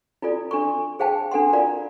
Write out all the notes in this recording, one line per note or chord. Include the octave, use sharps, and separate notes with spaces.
E4 F4 A4 D5
D4 A4 C6 C#6
G#4 C5 F5 G5 A5
D4 A4 F#5 C6
E4 F4 A#4 D5 F5